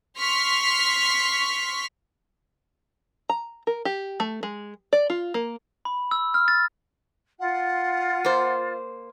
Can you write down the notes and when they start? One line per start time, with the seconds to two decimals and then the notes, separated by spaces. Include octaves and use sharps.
0.19 C6 C#6 F6 B6
3.30 A#5
3.67 A#4
3.85 G4
4.20 A3
4.43 G#3
4.93 D5
5.10 F4
5.34 A#3
5.85 B5
6.11 E6
6.34 F6
6.48 A6
7.39 F4 F#5
8.25 A#3 C5